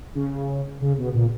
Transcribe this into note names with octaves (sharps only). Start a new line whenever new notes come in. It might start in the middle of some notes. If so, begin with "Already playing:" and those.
C#3
C#3
B2
A#2